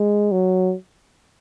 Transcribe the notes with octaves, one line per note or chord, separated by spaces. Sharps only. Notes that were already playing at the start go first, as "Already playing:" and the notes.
Already playing: G#3
F#3